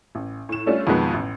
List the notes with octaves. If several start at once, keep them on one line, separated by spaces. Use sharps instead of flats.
A1
A2 E7
G3 A3 C#4 D4 F4
F2 B2 D#3 F3 G#3 B3
A1